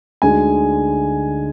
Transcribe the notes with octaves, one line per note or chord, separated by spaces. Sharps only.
D2 D3 G#3 D#4 G#5